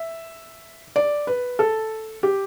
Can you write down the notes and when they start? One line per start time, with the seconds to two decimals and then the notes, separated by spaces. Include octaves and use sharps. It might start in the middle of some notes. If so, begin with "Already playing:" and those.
Already playing: E5
0.96 D5
1.27 B4
1.59 A4
2.23 G4